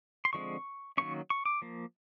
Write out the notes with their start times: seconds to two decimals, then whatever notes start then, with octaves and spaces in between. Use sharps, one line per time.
0.25 C6
0.33 D3 F3 G#3 C4 C#6
0.97 D#3 F#3 A#3 C#4 C#6
1.30 C#6
1.46 D6
1.62 F3 A#3